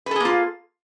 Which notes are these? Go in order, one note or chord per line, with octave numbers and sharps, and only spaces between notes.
A#3 F4 G#4 A4 B4